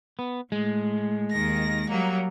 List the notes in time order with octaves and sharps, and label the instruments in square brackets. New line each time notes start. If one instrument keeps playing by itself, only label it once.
[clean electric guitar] B3
[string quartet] A2 [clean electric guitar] G#3
[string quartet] D#2 D#3 A#6
F#3 G3 A#3